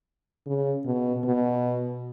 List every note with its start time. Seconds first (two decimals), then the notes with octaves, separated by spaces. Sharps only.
0.47 C#3
0.86 B2
1.24 B2